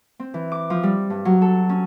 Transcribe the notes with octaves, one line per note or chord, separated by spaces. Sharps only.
C4
E3
D6
F3
G3
G2
F#3
A4
C#4